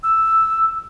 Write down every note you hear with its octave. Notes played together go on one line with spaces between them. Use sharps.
E6